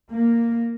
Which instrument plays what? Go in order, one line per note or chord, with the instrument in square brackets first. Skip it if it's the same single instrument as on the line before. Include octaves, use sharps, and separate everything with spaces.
[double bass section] A#3